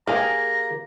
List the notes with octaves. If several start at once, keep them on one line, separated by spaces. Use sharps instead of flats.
A#3 G4 G#4 A#4 A#5